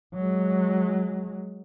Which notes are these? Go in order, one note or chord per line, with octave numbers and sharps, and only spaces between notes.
F#3 G#3